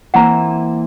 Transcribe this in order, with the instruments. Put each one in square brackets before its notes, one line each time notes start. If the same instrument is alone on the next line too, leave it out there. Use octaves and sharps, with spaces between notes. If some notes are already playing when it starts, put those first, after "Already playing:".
[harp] E3 A#3 C4 [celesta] F#5 A#5